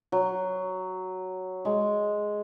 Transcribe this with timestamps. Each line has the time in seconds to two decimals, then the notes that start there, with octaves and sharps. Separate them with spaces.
0.12 F#3
1.65 G#3